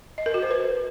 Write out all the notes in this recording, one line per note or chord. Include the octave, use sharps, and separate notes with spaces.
D#5
A#4
F#4
C5
B4